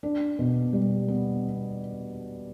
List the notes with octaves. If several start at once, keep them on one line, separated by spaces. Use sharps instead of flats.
D4
B2
G3
B3